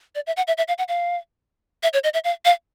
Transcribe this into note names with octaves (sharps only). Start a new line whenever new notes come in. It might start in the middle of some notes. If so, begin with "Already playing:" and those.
D5
E5
F#5
E5
E5
F5
F#5
F5
E5
C#5
D#5
E5
F5
F5